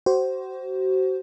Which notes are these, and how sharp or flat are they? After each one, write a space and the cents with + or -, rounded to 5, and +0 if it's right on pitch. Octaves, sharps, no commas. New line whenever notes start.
F#4 +35 C5 +0